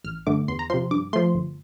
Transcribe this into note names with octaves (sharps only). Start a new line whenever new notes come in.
A1 F6
G2 D3 A3 D6
E2 C6
A#5
C3 F3 C6
G2 D6
F3 A3 C6
G1